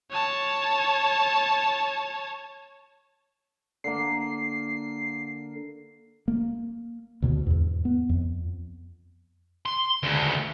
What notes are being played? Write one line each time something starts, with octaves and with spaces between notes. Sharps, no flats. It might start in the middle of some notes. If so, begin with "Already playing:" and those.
C#5 A5
D3 A#3 C7
A#3
D2 B2
E2 G#2
B3
F2
C6
D2 C#3